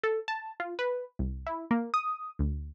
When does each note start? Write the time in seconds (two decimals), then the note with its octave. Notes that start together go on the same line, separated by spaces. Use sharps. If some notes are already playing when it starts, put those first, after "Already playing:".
0.04 A4
0.28 A5
0.60 F4
0.79 B4
1.19 C2
1.47 E4
1.71 A#3
1.94 D#6
2.39 D2